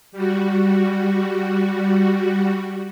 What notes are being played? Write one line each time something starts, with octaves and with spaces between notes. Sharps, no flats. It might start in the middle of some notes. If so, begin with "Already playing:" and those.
G3 F#4